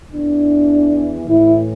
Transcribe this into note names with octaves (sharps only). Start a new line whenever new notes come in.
E2 E3 D4
A2 E3 E4